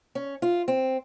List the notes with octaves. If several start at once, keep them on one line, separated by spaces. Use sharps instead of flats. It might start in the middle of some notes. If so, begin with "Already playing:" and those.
C#4
F4
C4